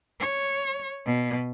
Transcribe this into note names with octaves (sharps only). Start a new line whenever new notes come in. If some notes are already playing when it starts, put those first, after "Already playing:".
C#5
B2